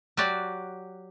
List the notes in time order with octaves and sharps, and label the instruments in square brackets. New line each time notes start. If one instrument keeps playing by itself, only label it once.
[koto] F#3 F#4 G4 D5